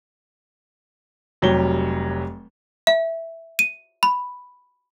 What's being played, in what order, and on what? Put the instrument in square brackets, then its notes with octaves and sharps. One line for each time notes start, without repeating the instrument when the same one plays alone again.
[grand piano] F1 F#3 G3 G4 C#5 G7
[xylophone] E5
D#7
B5